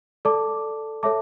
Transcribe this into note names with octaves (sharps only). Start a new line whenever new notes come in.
A4 D5 A5 D6
A4 C#5 E5 A5 D6